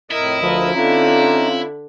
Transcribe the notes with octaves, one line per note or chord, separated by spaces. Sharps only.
F2 A2 E4 A#4 D#5
D2 F3 A#4 B4
D3 C4 C#4 D#4 F4 E5 A#5